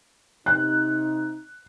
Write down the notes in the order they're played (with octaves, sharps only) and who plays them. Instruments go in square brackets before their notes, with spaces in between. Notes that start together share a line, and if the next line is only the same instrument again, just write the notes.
[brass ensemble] C3 D#4 [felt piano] F#6